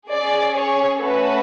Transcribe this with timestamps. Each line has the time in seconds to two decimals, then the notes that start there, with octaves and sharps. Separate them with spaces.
0.12 C#4 G#4 D5
0.56 C#5
1.01 A3 C#4 F#4 A4 B4